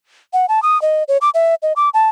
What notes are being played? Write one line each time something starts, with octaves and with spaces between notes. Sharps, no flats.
F#5
A5
D#6
D#5
C#5
D6
E5
D#5
D6
A5